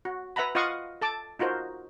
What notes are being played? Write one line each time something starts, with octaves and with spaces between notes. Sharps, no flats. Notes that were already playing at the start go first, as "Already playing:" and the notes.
F#4
B4 E5 F#5 A#5 B5
F4 D#5 F5 F#5 C#6 D#6
A4 A5 D6
D#4 F4 F#4 A#4 C5